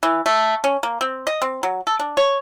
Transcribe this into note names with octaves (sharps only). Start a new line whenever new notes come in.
E3
A3
C#4
A#3
C4
D#5
C4
F#3
A4
D4
C#5